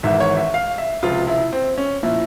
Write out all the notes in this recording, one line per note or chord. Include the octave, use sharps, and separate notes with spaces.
G#1 G#2 E3 E5
C#5
E5
F5
E5
C#2 C3 F3 F4
E4
C4
C#4
A#2 F3 E4